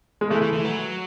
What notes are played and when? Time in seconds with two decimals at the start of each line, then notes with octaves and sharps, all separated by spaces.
0.21 G#3
0.30 E3 A3
0.42 E3
0.53 E3
0.65 F#3